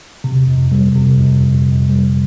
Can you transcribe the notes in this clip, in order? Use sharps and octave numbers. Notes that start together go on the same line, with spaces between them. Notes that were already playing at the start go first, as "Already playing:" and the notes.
C3
F2
G3
C3
F2
F2
F2
G3